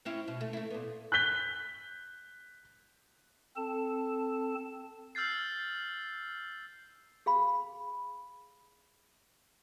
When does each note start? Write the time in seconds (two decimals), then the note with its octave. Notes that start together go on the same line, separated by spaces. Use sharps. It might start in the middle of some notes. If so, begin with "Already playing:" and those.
0.05 C4 C#4 E4
0.28 B2
0.41 A3
0.53 A3 E4
0.70 A#2 B3
1.12 F#6 G6 B6 G7
3.56 C4 A4 A5
5.15 E6 F6 G6 A6 C7
7.26 G#4 F5 B5